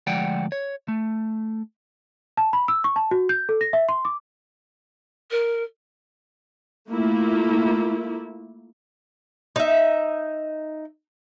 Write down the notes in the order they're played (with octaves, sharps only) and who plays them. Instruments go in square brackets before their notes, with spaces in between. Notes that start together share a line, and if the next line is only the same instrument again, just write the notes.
[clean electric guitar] D2 F3 G#3 D5 F#5 G5
C#5
A3
[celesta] A5
B5
E6
C#6
A5
F#4
G6
A4
A#6
E5
C6
D6
[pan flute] A#4
[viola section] A3 A#3 E4 F4
[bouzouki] D#4 E5